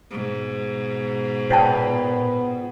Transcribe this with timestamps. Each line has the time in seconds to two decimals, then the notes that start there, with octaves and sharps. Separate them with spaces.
0.11 G#2 B2
1.50 A#2 B3 C#5 G5 A5